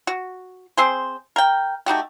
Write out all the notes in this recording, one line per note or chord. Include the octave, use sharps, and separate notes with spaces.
F#4
C4 G#4 C5
A#4 G5
A3 D#4 F#4 G4